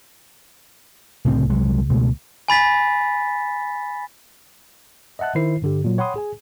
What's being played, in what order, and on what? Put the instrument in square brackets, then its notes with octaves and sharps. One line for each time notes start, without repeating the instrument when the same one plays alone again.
[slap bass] C2 A2 C#3 C4
C2 F#3 G#3
C#2 B2 G#3 A3
[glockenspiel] G#5 B5 A6 B6
[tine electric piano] D#5 E5 F#5 A5 F#6
D#3 E4 C5 C7
G2 D3 G4
A#2 F#3
C#5 F#5 G5 B5 C6 D#6
G#4 G#5